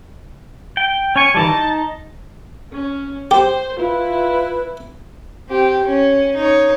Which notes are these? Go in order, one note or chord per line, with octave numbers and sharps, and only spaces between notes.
G5
C#4 G#5 C#6
D#3 E3 G3 A5
D#4
C#4
G4 C5
E4 F4 B4
C4 G4
C#4
D#4 C#5